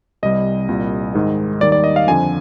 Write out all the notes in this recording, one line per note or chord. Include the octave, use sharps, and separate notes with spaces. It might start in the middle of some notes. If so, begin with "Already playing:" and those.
C2 C3 G3 D#5
C2 A#2 G3
G#2 D#3 G#3
D#2 D#3 G3 D5
D5
D#5
F5
F2 D3 F3 G#5